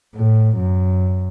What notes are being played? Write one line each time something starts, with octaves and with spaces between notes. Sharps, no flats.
A2
F#2